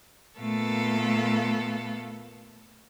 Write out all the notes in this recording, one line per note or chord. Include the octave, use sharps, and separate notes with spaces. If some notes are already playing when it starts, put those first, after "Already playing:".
A#2 A3 B3 A4 F5